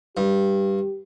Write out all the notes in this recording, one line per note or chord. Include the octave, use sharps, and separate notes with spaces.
G2 G4